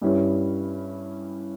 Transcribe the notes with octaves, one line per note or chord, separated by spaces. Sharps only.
G2 G3 C#4 E4